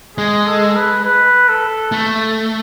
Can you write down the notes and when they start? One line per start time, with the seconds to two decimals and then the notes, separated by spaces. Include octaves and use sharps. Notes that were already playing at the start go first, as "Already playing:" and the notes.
0.17 G#3 G#4
0.47 A4
0.76 B4
1.04 B4
1.49 A4
1.92 A3